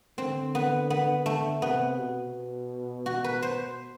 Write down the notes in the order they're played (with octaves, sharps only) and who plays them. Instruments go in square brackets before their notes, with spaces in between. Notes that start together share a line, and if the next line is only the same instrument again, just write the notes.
[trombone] D3 [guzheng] C4
[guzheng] B3
B3
A3
[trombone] C3 [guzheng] B3
[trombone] B2
[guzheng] F#4
B4
C5